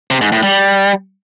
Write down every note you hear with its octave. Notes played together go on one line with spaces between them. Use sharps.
C3
G#2
A2
G3